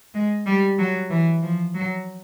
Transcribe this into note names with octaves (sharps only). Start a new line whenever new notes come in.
G#3
G3
F#3
E3
F3
F#3